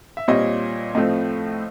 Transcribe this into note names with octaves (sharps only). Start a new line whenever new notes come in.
E5
A#2 G3 C4 C#5 D#5
A2 F3 A3 C4 D#5 F5